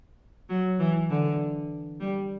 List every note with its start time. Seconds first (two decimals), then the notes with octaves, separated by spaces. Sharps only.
0.49 F#3
0.79 E3
1.09 D3
2.00 G3